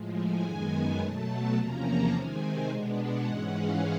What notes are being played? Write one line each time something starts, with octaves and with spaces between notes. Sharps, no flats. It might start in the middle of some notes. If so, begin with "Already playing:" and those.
Already playing: A2 F3 G#3
G#5
F#2 D#3 G#3 B3
G#5
B2 F#3 A3 A5
E2 C3 F3 A#3 C#4 A#5
A5
C3 D#3 G#3 C4 G#5
G#5
B2 G#3 B3 D4
F#5
G#2 E3 G#3 C#4
F5